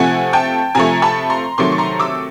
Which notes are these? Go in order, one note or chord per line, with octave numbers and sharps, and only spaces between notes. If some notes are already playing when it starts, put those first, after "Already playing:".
Already playing: C3 F3 A3 F#5 G#5
G5 A5
C3 F3 A3 G#5 A#5
A5 B5
A#5 C6
C3 D#3 F#3 A3 C6 D6
C#6
A#5 C6
D6 E6